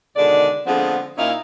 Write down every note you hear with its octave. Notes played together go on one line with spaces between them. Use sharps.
B2 D3 D#3 G#3 D5
D3 F3 G#3 B3 C4 G#4
A#2 C#4 D#4 E4 D#5 F5